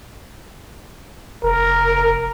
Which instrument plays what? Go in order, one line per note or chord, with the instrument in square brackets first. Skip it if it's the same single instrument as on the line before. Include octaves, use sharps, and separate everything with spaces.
[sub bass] F1 [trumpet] A#4